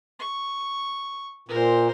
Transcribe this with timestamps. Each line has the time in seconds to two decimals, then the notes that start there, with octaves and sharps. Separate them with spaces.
0.19 C#6
1.48 A#2 A#4 C5